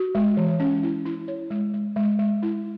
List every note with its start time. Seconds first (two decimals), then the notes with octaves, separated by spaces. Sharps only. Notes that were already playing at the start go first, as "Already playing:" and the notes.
Already playing: F#4
0.15 G#3
0.37 E3
0.60 C#4
0.83 E4
1.06 E4
1.28 C#5
1.50 G#3
1.74 G#3
1.96 G#3
2.19 G#3
2.43 E4